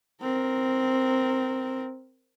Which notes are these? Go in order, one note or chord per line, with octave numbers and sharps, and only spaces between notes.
C4 A#4